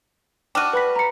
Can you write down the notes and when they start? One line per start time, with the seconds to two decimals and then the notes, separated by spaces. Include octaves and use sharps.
0.55 D4 F#4 G5 F6 D#7
0.73 B4 B5 B6
0.96 A#5 C#7